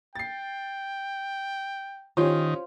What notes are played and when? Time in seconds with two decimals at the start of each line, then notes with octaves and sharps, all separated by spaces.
0.15 G5 A6 C7
2.17 D#3 C#4 F4 G4 C5 C#5